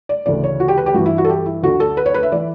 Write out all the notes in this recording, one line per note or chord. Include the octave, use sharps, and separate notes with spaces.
D5
D2 C#3 E3 D5
C#5
F#4
G4
B4
G4
G2 E3 F#4
E4
F#4
A4
G4
E4
D2 D3 F#4
A4
B4
C#5
B4
E5
E3 D5